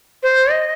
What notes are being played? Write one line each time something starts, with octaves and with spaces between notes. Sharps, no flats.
C5
D#5